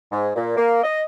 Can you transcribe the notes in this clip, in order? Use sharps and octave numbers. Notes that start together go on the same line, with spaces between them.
G#2
A#2
A#3
D#5